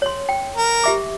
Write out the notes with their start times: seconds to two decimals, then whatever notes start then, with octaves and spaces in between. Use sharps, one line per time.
0.02 C#5 C6
0.29 G5
0.56 A#4
0.84 G4 E5 D6